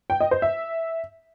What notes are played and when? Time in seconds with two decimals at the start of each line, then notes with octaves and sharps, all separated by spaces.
0.10 G5
0.21 D#5
0.31 C5
0.42 E5